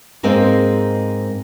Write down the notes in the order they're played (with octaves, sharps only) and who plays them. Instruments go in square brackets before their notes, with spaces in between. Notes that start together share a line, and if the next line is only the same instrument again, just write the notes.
[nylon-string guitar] G#2 G#3 A#3 C4